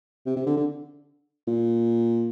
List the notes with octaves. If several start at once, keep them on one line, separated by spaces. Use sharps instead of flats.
C3
C3
D3
D3
A#2